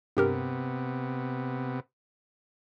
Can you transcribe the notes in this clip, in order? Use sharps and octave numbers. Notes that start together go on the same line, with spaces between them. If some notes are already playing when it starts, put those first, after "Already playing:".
G2 C3 B3 G4 A#4